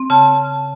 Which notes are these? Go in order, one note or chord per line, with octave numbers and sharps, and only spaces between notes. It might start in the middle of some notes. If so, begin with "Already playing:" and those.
Already playing: C4
C#3 A5